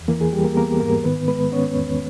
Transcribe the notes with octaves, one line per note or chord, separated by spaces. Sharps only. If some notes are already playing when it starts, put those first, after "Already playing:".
Already playing: E2
E3 A#3 A#4
G#4
G3 G4
A#3 A#4
A#3 B3 A#4
G#2 A#3 A#4
D#3 B3 B4
G#3 B3 B4
B3 C#4 C#5
E2